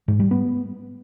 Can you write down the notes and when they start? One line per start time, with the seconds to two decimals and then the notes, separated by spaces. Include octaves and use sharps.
0.08 G#2
0.20 G3
0.31 B3